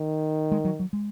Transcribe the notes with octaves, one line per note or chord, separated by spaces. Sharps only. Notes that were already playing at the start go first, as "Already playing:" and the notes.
Already playing: D#3
G#3
F#3
F#3
G#3